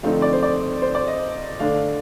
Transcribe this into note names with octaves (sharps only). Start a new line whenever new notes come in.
D3 F3 A3 C4 D#4 F5
D5
C5
D5
C5
D5
D#5
D3 A3 D4 F5